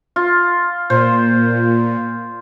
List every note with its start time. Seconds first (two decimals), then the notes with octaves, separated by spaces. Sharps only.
0.16 F4
0.90 A#2 C5